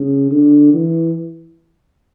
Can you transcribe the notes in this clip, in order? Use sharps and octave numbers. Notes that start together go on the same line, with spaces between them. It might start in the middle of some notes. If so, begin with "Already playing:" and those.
Already playing: C#3
D3
E3